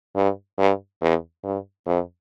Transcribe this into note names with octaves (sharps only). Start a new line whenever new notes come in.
G2
G2
E2
G2
F2